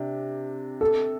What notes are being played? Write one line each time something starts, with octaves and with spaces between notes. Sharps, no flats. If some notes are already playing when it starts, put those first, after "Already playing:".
Already playing: C3 D4
A4